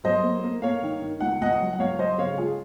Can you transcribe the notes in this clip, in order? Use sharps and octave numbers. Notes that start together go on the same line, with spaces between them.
F#3 C5 D#5
A#3
A#3
A#3 C#5 F5
D#3
D#3
C#2 F#5
C#2 D#5 F#5
F#3
F#5
C#2 C#5 F5
F#3 C5 D#5
C#3 C#5 F5
G#3 F4 G#4